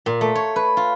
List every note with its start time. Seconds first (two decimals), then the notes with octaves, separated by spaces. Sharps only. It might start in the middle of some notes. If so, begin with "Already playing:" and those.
0.06 A#2
0.21 A3
0.35 C#5
0.56 B4
0.77 F4